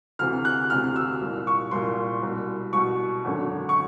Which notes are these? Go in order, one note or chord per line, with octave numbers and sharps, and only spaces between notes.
D2 C3 E3 F6
F#6
D2 C3 E3 F6
E6
C2 A#2
C#6
C2 A#2 C6
C2 B2
C2 B2 C#6
G#1 F#2 D3
C#6